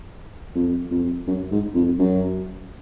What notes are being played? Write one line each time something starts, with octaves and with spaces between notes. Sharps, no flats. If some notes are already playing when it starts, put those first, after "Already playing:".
F2
F2
F#2
G#2
F2
F#2